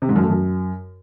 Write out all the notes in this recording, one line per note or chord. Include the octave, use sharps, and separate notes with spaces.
C3
G#2
F#2
A3
F#2